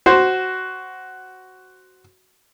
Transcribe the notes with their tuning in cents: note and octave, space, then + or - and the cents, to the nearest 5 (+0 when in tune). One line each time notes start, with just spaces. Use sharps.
F#4 +10 C5 +0